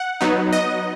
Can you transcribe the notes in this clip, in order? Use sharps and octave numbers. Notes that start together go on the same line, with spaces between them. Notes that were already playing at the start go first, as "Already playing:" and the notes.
Already playing: F#5
F#3 B3 D#4
D#5